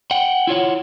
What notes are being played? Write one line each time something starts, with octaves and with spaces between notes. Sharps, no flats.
F#5 G5
E4 F4 C#5 F#5